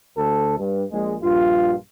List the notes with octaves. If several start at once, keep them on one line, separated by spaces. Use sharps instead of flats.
D2 A4
G2
A#1 G#3
A#1 G2 F4